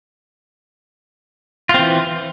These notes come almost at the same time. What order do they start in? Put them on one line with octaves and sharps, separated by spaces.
F4 C4 E3